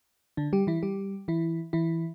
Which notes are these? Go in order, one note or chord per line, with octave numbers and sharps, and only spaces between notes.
D3 D4
G3 G4
E3 E4
G3 G4
E3 E4
E3 E4